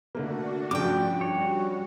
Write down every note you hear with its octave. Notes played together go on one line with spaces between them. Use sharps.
D3 A3 A#3 D4 F#4
G2 C#3 F3 A3 G5 D6
G3 F#4 C#5